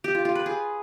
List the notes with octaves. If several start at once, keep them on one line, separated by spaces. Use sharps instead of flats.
G4
F4
F4
B4
G#4